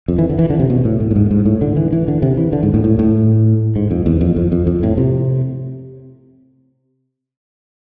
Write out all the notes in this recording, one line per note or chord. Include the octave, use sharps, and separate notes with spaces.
F2
E3
D3
E3
D3
C3
B2
A2
A2
A2
G#2
G#2
A2
D3
E3
E3
D3
C3
E3
D3
G#2
A2
A2
A2
G#2
F2
E2
F2
F2
F2
F2
A2
C3